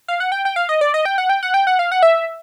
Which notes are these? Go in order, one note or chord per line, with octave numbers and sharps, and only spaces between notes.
F5
F#5
G5
G5
F5
D#5
D5
D#5
G5
F#5
G5
F#5
G5
F#5
F5
F#5
E5